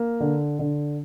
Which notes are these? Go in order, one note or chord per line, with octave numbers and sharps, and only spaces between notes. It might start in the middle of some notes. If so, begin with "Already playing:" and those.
Already playing: A#3
D3
D3